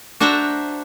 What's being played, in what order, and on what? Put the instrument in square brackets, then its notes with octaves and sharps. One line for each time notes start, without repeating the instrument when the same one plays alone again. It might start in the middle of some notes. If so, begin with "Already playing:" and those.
[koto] D4 F#4 C5 E5 A5 A#5